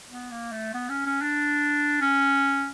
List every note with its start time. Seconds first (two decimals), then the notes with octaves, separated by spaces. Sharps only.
0.09 B3
0.31 A#3
0.52 A3
0.74 B3
0.89 C#4
1.06 C#4
1.21 D4
2.01 C#4